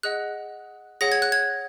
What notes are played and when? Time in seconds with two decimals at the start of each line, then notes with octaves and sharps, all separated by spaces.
0.03 G#4 D#5 F#5 F#6
1.01 G#4 C#5 F#5 A#6
1.12 G#6
1.22 F#6
1.32 G#6